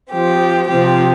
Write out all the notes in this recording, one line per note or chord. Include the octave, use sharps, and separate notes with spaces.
F3 C4 G4
C3 F3 C4 G4